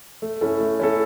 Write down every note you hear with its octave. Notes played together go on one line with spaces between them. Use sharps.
A3
C#4 E4 A4
A3
C#4 E4 A4